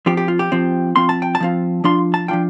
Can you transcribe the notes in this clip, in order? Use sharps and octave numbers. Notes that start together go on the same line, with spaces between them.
F3 C4 F4 G4
G4
F4
G4
F3 C4 F4
F3 C4 F4 C6
A5
G5
A5
F3 C4 F4
F3 D4 F4 C6
A5
F3 D4 F4 G5